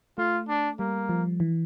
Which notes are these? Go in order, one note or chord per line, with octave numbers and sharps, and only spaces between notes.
A3 F4
D4
G3 A#3
F3
E3